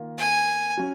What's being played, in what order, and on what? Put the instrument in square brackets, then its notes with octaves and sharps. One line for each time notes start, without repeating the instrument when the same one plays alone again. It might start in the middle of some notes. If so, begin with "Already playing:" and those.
Already playing: [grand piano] D#3 A#3 F4
[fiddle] G#5
[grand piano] F#3 C#4